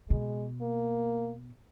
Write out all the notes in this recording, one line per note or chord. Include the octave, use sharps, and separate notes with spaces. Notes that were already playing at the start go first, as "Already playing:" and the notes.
B2 G#3
A#3